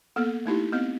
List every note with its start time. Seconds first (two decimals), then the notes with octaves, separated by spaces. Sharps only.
0.16 A#3 B3 A4
0.46 A3 D#4 E4 G4
0.72 B3 C4 D#5